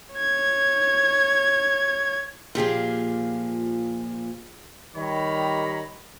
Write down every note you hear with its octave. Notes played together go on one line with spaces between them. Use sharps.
C#5 G#6
A#2 F3 F4 G4 G#4
D#3 G3 G4 C#5 A#5 B5